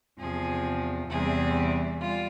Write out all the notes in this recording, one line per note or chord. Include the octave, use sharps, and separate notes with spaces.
E2 C3 F3 G#4
E2 C3 E3 G3 G#4
G3 F4